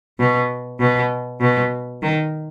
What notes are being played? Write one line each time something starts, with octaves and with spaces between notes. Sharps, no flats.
B2
B2
B2
D#3